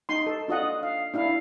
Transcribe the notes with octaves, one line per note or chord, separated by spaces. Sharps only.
D#4 C6
A4
D4 F4 D#5 F#5
F5
D4 E4 F5